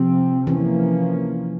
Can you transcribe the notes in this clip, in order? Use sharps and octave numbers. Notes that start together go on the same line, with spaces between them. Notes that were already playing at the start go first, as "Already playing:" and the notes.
Already playing: C3 F3 C4
E3 F3 A#3 C#4